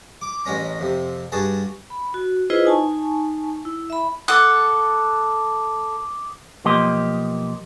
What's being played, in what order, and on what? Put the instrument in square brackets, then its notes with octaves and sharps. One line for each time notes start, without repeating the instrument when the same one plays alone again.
[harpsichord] D6
A1 G#3 C#4 A#5
F2 C3
G2 F#4 G#4 A5
[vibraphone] B5
F#4
E4 F4 G#4 B4 C5 D#5
D#4 G#5 A5 C#6
E4
E5 B5
[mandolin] A4 F#5 [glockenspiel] D6 D#6
[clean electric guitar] B1 F3 A#3 G4 D#5 C6